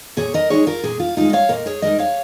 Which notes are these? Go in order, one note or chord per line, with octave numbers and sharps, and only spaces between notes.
A#2 G#4 C#5
A#4 D#5
G#3 D#4 G#4 C#5
F4 A#4
A#2 G#4
F4
G#3 D#4 F4
D#5
C#5 F5
A#2 A#4 D#5
G#4 C#5
G#3 D#4 A#4 D#5
C#5 F5